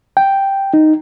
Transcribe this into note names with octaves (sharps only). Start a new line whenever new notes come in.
G5
D#4